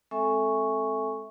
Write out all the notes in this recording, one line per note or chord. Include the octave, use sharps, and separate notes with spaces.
G#3 C4 A4 E5 G#5 C#6